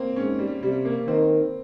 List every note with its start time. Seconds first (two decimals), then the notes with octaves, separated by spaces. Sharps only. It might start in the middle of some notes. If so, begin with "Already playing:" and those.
Already playing: A#3 C4
0.16 G#2 C#4
0.39 G3
0.62 C3 G3
0.85 A#3
1.08 D#3 C4